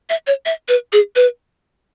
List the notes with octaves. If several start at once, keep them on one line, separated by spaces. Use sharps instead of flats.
E5
C#5
E5
B4
G#4
B4